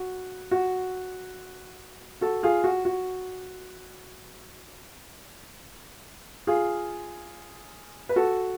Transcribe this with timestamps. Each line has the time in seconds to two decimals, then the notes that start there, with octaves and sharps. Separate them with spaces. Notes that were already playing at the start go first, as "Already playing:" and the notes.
Already playing: F#4
0.51 F#4
2.21 F#4 A4
2.43 F4 G#4
2.64 F#4
2.85 F#4
6.47 F4 G#4
8.09 B4
8.16 F#4 A4